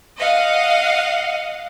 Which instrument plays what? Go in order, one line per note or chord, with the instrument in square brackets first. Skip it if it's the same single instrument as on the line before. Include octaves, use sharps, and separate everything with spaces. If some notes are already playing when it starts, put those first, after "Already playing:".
[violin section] D#5 F5 F#5